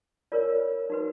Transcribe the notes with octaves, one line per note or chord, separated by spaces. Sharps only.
F4 A#4 C#5 D5
D#4 F#4 B4